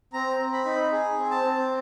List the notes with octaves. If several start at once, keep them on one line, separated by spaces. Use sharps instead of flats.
C4 A#5
C4
B5
D#4
G#4
C4
A5
C4